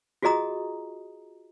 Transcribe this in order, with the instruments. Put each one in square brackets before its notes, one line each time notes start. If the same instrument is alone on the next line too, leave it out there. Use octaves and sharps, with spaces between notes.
[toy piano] F4 F#4 G#4 D#5 A#5 D#6